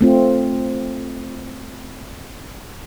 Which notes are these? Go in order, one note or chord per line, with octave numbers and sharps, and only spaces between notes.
A3 C4 F4